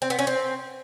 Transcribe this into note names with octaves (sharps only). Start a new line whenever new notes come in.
C4
B3
C#4
C4